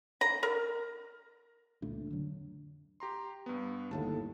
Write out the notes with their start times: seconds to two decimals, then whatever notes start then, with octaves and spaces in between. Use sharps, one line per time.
0.21 A#5
0.43 A#4
1.82 C#2 A#2 A3 D4
2.08 F2 D3 F#3
3.00 G4 A#5 C6
3.46 G2 B3
3.91 G1 D#2 A2 A5